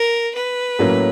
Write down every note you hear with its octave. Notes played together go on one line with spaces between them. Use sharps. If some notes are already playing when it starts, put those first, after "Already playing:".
Already playing: A#4
B4
A2 F#3 A#3 C#4